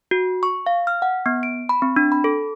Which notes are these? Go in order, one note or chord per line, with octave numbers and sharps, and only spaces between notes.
F#4
C#6
F5
F6
F#5
B3
D7
B5
C4
D4
B5
A4